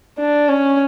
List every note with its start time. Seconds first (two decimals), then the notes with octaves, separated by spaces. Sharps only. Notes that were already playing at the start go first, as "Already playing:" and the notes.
0.19 D4
0.49 C#4